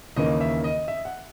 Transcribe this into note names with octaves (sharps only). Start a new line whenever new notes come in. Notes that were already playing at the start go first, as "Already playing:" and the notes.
D#2 C#3 E3 A#3 D#5
E5
D#5
E5
F#5